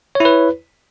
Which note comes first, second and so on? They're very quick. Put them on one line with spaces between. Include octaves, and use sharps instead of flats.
C#5 E4 B4